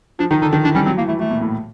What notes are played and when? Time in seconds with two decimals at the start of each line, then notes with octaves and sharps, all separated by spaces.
0.19 F3 D4
0.31 D#3 D#4
0.42 D3 D#4
0.52 D#3 D4
0.64 E3 D4
0.75 G3 C#4
0.86 F#3 C4
0.97 E3 A#3
1.08 E3 A3
1.19 E3 A3
1.31 A#2
1.41 A2